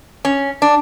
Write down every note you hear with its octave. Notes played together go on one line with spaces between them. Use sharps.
C#4
D4